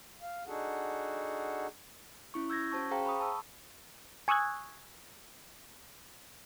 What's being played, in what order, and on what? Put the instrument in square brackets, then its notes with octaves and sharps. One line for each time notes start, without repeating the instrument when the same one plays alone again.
[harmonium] F5
D4 D#4 F#4 G#4 A4 F#5
[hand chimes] C#4 E4 C#6
E6 G6 G#6 A#6
C#4 F#4 C5 A5 C#6
G#4 C5 F5 G5 A#5
B5 C#6 D#6
A5 E6
[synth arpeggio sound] G#5 C#6 D#6 E6 F#6 G#6